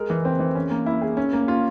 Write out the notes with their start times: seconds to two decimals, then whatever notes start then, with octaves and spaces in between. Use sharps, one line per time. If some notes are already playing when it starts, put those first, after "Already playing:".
Already playing: G#3 A#4
0.10 E3
0.25 C4
0.40 E3
0.55 C#4
0.70 A#3
0.86 E4
1.02 G#4
1.17 C#4
1.33 A#3
1.48 F4